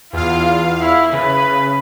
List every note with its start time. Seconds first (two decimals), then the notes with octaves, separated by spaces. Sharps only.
0.13 E2 F4 F5
0.81 E4
1.12 C#3 B4